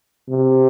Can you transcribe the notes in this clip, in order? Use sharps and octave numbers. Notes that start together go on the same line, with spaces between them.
C3